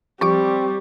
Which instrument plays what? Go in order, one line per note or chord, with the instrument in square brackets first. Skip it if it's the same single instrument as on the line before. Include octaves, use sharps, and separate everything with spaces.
[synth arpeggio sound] F3 G4 D6 [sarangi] G3 [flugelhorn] C4 [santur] C#6